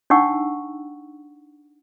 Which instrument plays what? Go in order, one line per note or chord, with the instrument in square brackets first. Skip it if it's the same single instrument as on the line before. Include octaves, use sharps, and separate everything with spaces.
[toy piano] D4 D#4 F#5 G5 C#6 E6